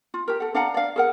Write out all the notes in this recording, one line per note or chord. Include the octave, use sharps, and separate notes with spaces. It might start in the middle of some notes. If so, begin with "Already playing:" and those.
F4
G4 A#4
A4 F#5
D4 F5 F#5 A#5
D5 F5
G#4 A#4 F#5